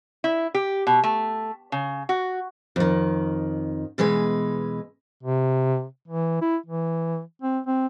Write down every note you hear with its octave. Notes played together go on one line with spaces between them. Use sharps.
E4
G4
B2
A3
C#3
F#4
F2 D#3
B2 E3 G#3 B4
C3
E3
E4
E3
C4
C4